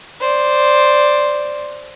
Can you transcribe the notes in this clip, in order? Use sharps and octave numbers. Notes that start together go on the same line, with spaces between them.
C5 D5